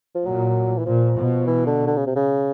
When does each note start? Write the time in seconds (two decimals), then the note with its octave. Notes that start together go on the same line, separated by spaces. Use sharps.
0.15 F3
0.26 A#2 F#3
0.78 E3
0.86 A#2 F3
1.16 B2
1.47 E3
1.66 D3
1.87 D3
1.97 C#3
2.07 C3
2.16 C#3